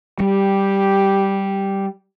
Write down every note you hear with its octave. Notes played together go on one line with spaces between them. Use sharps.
G3 G4